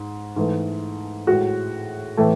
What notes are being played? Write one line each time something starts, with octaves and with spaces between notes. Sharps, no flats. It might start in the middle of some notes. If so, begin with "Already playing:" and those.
Already playing: G#2
G#2 E3 A3
A2 G#3 F#4
A2 E3 A3